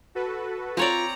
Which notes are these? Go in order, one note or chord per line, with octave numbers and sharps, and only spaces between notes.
F#4 A4 B4
C4 F4 C#5 D5 A#5